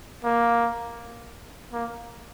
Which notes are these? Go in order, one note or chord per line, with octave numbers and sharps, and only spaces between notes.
A#3
A#3